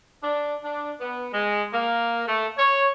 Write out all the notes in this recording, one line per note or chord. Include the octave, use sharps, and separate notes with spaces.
D4
D4
B3
G#3
A#3
A3
C#5